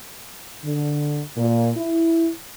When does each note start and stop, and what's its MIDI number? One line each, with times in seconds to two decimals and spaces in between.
0.65 1.21 50
1.37 1.71 46
1.77 2.31 64